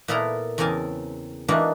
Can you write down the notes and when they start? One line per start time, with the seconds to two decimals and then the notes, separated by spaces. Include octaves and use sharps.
0.08 A#2 B3 E4 A4 A#4 A#5
0.58 E2 C#3 C4 A#4 G#5 A5
1.48 E3 A#3 D4 D#4 F4 F#4